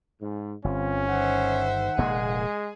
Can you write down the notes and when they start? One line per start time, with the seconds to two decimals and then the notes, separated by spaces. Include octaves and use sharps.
0.21 G#2
0.64 G1 C4 C#4 F4
1.08 D#3 C5 E5 F#5
1.98 F1 A#2 G#3 A#3 G#4